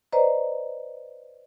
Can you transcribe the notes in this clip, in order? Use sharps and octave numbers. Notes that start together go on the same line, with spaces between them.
B4 C5 D5 D#5 A#5